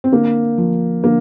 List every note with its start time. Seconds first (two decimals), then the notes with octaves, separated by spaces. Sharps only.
0.04 C4
0.12 D3 A#3
0.58 F3
1.04 D3 A#3